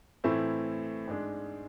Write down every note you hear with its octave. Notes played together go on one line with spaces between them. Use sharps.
A2 E3 A3 C4 E4
G#2 G#3 D4